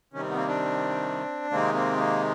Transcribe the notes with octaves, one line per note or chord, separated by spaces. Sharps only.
C3 D#3 G3 C#4
C4
B3
A#3 C4
C4 D4
C3 D#3 G#3 A#3 C4
A#3 C4
A#3